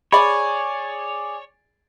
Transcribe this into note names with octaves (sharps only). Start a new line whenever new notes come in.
G#4 C#5 D5 G#5 B5